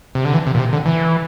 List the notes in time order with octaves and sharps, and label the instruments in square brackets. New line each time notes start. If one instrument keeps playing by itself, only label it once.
[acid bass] C3
D3
E3
C3
A#2
C3
D3
E3